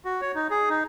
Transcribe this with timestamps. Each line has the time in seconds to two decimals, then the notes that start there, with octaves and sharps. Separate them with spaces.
0.05 F#4
0.21 C#5
0.35 D#4
0.50 G#4
0.69 D#4